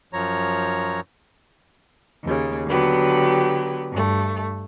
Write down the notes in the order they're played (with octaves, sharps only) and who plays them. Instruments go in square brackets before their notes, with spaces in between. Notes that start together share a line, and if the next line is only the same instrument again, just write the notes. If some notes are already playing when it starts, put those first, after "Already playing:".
[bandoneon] F#2 F3 C#5 A#5
[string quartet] D#2 C#3
D3 F#3 B3 G4
G2 A3